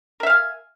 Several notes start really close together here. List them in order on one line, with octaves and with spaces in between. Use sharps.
A#4 E5 F5 G#5